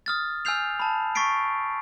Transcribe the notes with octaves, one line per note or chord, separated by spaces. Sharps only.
D#6 F6 A6
G#5 E6 F6 G6 C7 F7
A5 B5
C#6 A6 B6 C7 D7